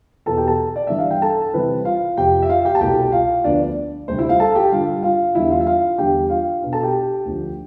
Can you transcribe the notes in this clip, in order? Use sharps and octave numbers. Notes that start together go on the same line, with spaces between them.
E2 B2 B3 E4 A4 A5
G4 G5
A4 A5
D5
G2 E3 G3 D4 E5
F5
G5
A4 A5
C3 E3 G3 C4 E4 B4
F4 F5
F2 C3 F3 G4 G5
E5
F4 F5
G4 G5
A5
C2 B2 A3 E4 G4 G5
F4 F5
D2 D3 F3 B3 D4 D5
D2 C3 G3 D4 C5
E4 E5
F4 F5
A4 A5
G4 G5
G2 D3 G3 F4 F5
F4 F5
E2 D3 G3 D4 E4 E5
F4 F5
E5
F4 F5
E2 D3 G3 D4 G4 G5
F4 F5
B2 B3 D4
A4 A5
G4 G5
D2 D3 F3